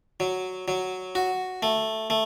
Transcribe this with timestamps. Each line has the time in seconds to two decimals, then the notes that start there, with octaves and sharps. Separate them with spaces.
0.20 F#3
0.68 F#3
1.15 F#4
1.63 A3
2.10 A3